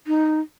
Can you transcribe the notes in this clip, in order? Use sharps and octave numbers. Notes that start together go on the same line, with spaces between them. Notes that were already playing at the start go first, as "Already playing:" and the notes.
D#4